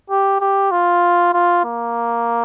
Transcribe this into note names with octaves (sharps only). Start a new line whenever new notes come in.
G4
G4
F4
F4
A#3